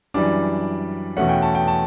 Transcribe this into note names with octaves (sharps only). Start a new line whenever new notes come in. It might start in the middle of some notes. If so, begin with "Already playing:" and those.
F#2 E3 G3 D4 D5
E2 B2 A3 C#4 F#5
G5
A5
G5
A5